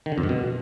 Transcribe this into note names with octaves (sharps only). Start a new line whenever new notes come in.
D#3
D3
F2
G2
B2